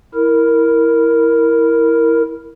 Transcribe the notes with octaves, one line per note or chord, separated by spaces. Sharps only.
E4 A#4